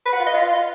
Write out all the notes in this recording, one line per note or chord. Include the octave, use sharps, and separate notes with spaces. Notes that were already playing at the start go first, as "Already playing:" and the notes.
B4
F#5
F4
D#5
F4